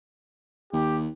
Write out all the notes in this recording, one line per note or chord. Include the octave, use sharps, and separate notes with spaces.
D#2 G4